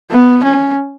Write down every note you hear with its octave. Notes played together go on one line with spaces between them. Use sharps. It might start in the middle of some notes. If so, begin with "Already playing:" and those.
B3
C#4